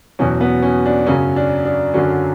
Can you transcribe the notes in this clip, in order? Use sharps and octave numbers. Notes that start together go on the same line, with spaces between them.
E2 B2 F#3 C#4
B3
C#4
D4
F#2 C#3 F#3 C#4
D4
D4
F#2 D3 F#3 C#4